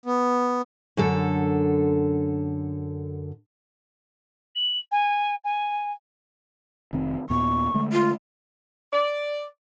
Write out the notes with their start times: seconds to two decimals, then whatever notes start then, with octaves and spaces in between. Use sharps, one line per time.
0.06 B3
0.97 F#2 D3 A4
4.56 F#7
4.92 G#5
5.44 G#5
6.93 F1 D#3 C4
7.30 D#2 A#2 B3 C#6
7.74 D3 G#3 A3
7.92 F4
8.92 D5